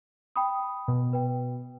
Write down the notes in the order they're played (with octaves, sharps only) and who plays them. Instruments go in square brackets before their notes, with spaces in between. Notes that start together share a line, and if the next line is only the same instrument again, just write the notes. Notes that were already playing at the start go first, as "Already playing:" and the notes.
[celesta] G5 B5 D#6
[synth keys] B2
[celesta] B4 G5